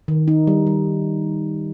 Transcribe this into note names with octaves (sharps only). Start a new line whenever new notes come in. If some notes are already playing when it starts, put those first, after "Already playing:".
D#3
D#4
G3
G3